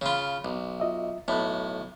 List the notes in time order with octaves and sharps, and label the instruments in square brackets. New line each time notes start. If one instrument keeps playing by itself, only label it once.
[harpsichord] C#3 F4 [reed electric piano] C#5 B5
[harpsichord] B1
[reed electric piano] F4 D#5 E5
[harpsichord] B1 A2 [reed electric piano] A5 B5 F#6